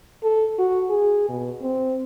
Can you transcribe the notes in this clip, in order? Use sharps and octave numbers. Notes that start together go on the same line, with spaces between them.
A4
F#4
G#4
B2
C4